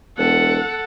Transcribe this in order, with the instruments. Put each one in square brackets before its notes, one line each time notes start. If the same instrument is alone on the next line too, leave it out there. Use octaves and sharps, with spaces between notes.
[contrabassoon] E1 [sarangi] A4 [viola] F#5